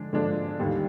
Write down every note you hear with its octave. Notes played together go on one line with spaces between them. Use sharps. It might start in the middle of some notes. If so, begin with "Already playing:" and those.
Already playing: D3 F3 G#3 D4
D3 F3 G#3 D4
D#2 D3 G3